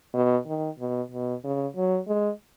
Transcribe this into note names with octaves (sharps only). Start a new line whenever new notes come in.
B2
D#3
B2
B2
C#3
F#3
G#3